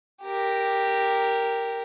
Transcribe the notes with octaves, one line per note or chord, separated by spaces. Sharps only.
G4 A#4